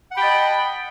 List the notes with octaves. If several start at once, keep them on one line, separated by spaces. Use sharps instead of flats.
D#5 F#5 G5 A5 B5